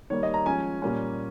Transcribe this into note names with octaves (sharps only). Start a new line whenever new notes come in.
D#3 G3 A#3 C#5
D#5
A#5
F3 G#3 C#4 G#5
A#2 G3 A#3 C#4